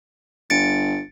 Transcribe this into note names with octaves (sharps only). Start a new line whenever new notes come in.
G1 A6 C#7 D7